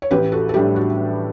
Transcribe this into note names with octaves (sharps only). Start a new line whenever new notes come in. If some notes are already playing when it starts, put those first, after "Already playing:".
C#5
A1 G4 B4
F#4 A4
A4
A2 G3 D4 G4
F#4